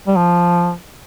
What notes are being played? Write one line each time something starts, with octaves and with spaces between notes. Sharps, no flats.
G3
F3